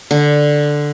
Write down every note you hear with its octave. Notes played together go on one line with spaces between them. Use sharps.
D3